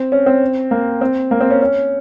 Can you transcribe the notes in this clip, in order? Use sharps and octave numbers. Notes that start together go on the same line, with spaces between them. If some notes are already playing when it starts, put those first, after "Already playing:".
Already playing: C4
C#4
C4
A#3
C4
A#3
C4
C#4
C#4